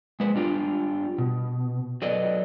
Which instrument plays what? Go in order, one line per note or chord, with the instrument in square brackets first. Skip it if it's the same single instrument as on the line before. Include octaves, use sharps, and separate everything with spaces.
[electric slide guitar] G#3 B4 C5
G3 D4 F4 G4
B2
F#3 A4 B4 D5 D#5